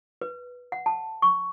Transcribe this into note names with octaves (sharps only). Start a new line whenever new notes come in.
B4
F#5
A5
C#6